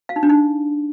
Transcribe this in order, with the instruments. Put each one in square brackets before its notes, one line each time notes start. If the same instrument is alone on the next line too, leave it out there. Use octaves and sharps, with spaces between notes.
[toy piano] F5
D#4
D4
D#4